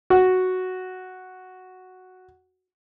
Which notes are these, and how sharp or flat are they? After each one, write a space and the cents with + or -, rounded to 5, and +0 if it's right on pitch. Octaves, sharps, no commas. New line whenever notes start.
F#4 +0